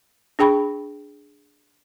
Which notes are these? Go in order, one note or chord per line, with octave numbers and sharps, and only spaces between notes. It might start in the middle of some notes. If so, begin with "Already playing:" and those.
D4 G#4 G5 B5 C#6